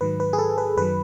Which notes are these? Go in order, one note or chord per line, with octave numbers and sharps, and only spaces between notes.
G#2 D#3 F#3 B4
B4
G#4
A4
B4
F#2 D#3 F#3 B4